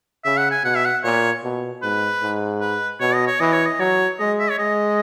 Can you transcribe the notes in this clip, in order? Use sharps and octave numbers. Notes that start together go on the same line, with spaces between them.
C#3 E5
F#5
G#5
B2 F#5
E5
F#5
A#2 C#5
B2
G#2 B4
G#2
B4
B2 C#5
D#5
C#5
E3 D#5
C#5
D#5
F#3 C#5
G#3 D#5
E5
C#5
G#3 D#5